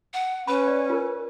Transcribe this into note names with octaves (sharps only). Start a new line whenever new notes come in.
F#5
C#4 B4 B5
D5
F4 A#4